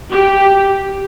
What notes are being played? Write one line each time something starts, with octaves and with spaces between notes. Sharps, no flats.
G4